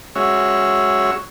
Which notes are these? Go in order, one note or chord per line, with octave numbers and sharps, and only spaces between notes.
G#3 C#4 F#4 C#5 E5